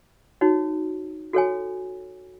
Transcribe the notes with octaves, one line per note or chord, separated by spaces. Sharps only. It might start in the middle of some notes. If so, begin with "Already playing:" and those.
D#4 F#4 C#5
F#4 A4 C#5 G#5